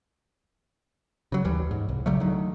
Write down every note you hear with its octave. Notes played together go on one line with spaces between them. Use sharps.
C#3 F#3
D#2 E3 G3
G#2
C2
C#3 F#3 G3 A3
D3 D#3 F#3